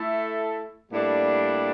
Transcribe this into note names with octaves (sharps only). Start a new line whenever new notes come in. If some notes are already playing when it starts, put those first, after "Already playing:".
Already playing: A3 E4 A4
A2 G3 A#3 D4